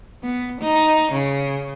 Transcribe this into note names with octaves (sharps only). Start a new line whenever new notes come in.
B3
D#4
C#3